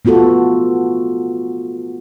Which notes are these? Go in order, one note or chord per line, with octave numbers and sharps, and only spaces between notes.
A3 B3 F4 F#4 A4